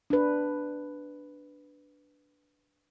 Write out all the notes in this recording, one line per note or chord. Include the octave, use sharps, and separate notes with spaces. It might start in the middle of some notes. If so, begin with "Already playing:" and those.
D4 B4